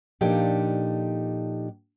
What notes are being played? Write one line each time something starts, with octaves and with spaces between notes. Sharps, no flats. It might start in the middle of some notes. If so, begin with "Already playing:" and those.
A#2 F3 D4 D#4 G4 A4